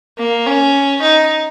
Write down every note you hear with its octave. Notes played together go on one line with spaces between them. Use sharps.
A#3
C#4
D#4